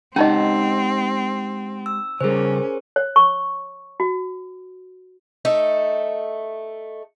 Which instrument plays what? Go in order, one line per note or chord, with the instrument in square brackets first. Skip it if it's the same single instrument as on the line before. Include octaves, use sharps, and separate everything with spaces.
[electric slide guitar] G#3 G4 F#5 [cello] C4 [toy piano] C#4 D#4 D#5
[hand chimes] E6
[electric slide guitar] C#3 G3 [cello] C#4 [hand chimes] G#4 A#4 C5
[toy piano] C#5
C#6
F#4
[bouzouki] A3 D#4 E5